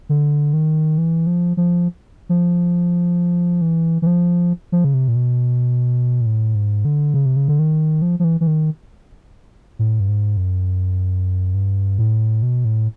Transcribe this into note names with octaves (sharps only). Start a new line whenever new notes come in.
D3
D#3
E3
F3
F3
F3
E3
E3
F3
F3
C#3
C3
A#2
B2
A#2
A2
G#2
D3
C#3
C3
C#3
D3
D#3
F3
F3
E3
E3
D#3
A2
G2
G#2
F#2
G2
A2
B2
A2